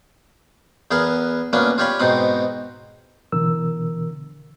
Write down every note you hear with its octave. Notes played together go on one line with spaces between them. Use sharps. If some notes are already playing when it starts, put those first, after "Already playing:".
E2 B3 G#4 A#4 F#5
D2 A#3 B3 C#4 D4 F#5
F4 G4 C#5 D5 B5
G#2 B2 C4 D#4 F#5
B2 D3 E3 A#4 E6